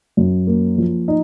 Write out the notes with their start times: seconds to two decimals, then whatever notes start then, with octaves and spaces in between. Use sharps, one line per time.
0.17 F#2
0.47 A#3
0.78 F3
1.08 D#4